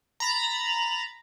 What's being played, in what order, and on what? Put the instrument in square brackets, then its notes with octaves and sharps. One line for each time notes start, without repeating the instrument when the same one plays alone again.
[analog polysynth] A#5 B5 A6